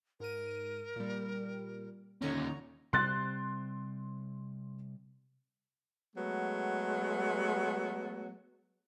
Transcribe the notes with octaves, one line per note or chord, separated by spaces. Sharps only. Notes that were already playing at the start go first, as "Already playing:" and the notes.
G#2 A#4 D#7
A#2 G3
D#2 D3 C#4 D#4 C#5 A#5
C3 G3 C4 C6 F#6 A6
F#3 G#3 A3 B3